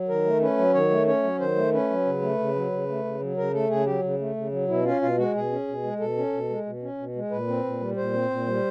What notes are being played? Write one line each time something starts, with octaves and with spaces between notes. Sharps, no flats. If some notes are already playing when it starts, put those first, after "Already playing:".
Already playing: F#3
D#3 A#4
A3
C#4 B4
F#3
D#3 C#5
A3
C#4 C#5
F#3
D#3 C5
A3
C#4 B4
F#3
C#3
A3
C#3
F#3
C#3
A3
C#3
F#3
C#3 A#4
A3 A4
C#3 G#4
F#3 G4
C#3
A3
C#3
F#3
B2 E4
C#4 F4
B2 F4
G#3 F#4
B2 G#4
C#4
B2
G#3
B2 A4
C#4
B2
G#3
B2
C#4
B2
G#3
A#2 B4
C4
A#2
G3
A#2 C5
C4
A#2
G3